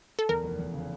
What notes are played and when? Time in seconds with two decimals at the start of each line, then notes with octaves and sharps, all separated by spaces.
0.19 A4
0.29 E2 A#4
0.44 F1
0.59 E2
0.74 C#3